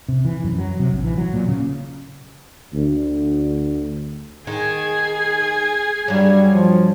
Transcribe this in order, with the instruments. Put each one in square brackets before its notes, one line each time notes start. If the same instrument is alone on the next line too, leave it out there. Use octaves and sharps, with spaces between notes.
[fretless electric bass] C3
E3
F#2
F#3
C3
A#1
E3
F#3
A#2
C#3
[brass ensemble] D2
[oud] D#3 [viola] G#4 G#5
[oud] G2 F#3 [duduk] G3
[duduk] F3